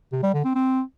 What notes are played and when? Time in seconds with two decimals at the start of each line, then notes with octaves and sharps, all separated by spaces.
0.12 C3
0.23 G3
0.34 D3
0.45 C4
0.55 C4